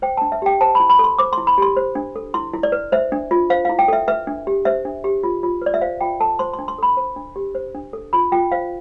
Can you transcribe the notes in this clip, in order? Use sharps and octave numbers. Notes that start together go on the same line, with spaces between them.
C5 G5
A5
D4
E5
G4 G5
C5 A5
B5
E4
B5
A4
C6
C5 D6
C6
E4
B5
G4 C6
C5
D4
A4
E4 C6
E4
D5
B4
C5 E5
D4
F4
C5 F5
F5
E4
G5
A4 E5
B4 E5
D4
G4
C5 E5
D4
G4
F4
F4
B4 D5
E5
C5 F5
F4 G5
A4 A5
C5 C6
C6
D4
C6
A4 B5
C5
D4
G4
C5
D4
A4
F4 B5
F4 G5
C5 F5